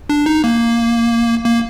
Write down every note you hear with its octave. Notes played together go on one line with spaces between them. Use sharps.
D4
D#4
A#3
A#3